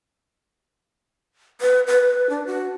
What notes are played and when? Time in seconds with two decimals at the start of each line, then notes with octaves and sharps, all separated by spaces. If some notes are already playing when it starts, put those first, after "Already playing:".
1.61 B4
1.87 B4
2.30 D4
2.47 F#4